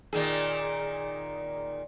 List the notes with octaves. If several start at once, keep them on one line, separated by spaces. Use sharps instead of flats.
A#2 D#3 G#4